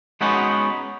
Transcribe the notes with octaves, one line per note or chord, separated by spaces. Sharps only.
G#3 B3 C#4 D#4 F#4 B4